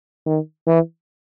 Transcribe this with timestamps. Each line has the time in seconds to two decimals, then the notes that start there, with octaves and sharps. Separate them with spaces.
0.26 D#3
0.67 E3